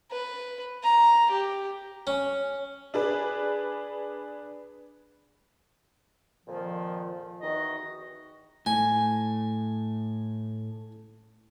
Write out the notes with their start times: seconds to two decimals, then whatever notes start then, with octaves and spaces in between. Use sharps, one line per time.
0.11 B4
0.83 A#5
1.31 G4
2.07 C#4
2.94 D4 G#4 B4
6.46 F2 A#2 D#3 F3
7.41 E2 D#3 F#4 D#5
8.66 A2 G#5